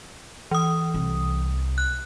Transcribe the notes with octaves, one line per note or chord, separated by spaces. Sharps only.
E3 D#6
C2
F#6